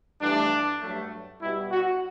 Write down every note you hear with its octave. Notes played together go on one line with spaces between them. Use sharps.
G2 E3 A3 D4
G2 F#3 A3
B2 G3 B3 E4
F#4